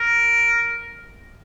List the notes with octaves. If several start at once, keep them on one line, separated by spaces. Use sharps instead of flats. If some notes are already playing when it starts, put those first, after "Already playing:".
Already playing: A#4